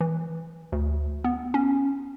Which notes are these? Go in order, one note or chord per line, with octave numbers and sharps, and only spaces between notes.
E3
D2
B3
C#4